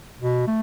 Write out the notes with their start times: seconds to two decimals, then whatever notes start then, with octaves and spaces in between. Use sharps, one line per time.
0.20 B2
0.47 A3